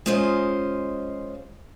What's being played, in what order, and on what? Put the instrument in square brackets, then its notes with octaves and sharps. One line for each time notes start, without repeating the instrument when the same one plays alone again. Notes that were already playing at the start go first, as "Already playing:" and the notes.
[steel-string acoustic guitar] G#3 C#4 F4 C5 D#5